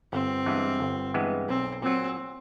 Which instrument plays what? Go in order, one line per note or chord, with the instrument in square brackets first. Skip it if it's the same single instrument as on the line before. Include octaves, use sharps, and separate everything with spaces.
[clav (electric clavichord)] G1 [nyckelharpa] C4
[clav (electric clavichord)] G2 E3 G#3 B3
G1
G2 E3 G#3 B3
[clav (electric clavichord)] B1 [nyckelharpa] C4
[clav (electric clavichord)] A#2 F#3 [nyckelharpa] C4